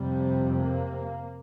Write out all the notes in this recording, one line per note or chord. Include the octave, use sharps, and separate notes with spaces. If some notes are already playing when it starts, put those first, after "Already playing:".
Already playing: F2 C3 G3
A#3